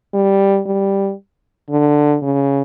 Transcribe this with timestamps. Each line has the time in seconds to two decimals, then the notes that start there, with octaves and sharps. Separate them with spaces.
0.14 G3
0.66 G3
1.70 D3
2.23 C#3